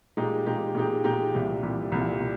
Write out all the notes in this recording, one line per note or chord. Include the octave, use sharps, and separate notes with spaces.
A#2 G#3 D#4 G4
A#2 G#3 D#4 G4
A#2 G#3 D#4 G4
A#2 G#3 D#4 G4
C2 A#2 G3
C2 A#2 G3
C2 A#2 G3
A#2